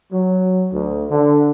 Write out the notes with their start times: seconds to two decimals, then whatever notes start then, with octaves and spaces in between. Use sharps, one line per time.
0.11 F#3
0.72 D2
1.10 D3